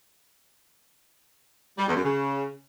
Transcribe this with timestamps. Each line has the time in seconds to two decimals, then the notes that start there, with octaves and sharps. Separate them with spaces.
1.78 G3
1.87 E2
1.95 F#2
2.04 C#3